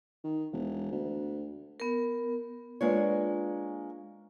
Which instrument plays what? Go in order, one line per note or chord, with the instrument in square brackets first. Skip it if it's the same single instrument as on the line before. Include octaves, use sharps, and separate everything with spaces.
[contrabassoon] D#3
E1
D2
[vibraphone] B3 A#4
[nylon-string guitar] G#3 A#3 D4 F4 B4 C#5